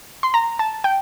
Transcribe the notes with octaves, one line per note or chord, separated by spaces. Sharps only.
C6
A#5
A5
G5